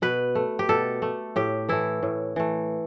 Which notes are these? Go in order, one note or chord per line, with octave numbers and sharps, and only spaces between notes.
B2 B4
A3
G4
B2 A4
A3
A2 G4
E3 A3 E4
A2
E3 A3